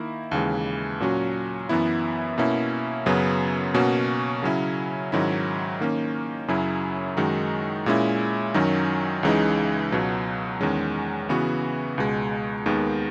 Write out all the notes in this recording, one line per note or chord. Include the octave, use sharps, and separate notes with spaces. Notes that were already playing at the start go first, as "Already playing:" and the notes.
Already playing: D#3 A#3 E4
D#2 C#3 E3 G#3
A#2 F#3 C#4 F#4
F#2 E3 B3 E4
B2 A#3 C#4 E4
F#2 C#3 F#3 B3
B2 A#3 C#4 F#4
C#3 F#3 C#4 E4
G#2 D#3 F#3 C#4 E4
D#3 A#3 C#4
F#2 C#3 F#3 C#4 E4
F#2 D#3 G#3 D#4 F#4
A#2 G#3 C#4 E4
F#2 D#3 F#3 C#4
C#2 C#3 E3 G#3 D#4
C#2 B2 F#3
E2 D#3 G#3 C#4
C#3 E3 B3 F#4
C#2 B2 G#3
D#2 D#3 G#3 B3